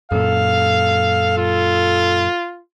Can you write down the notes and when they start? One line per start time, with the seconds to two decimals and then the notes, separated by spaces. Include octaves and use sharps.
0.12 F#2 A#2 A4 F5
1.38 F4